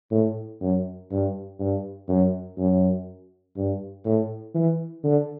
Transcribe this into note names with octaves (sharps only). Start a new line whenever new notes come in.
A2
F#2
G2
G2
F#2
F#2
G2
A2
E3
D3